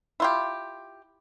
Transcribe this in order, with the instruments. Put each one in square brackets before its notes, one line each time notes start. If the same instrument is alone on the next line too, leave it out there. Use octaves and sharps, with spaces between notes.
[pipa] E4 F4 G4